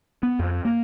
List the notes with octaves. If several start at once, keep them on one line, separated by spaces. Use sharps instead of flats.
B3
F2
A#3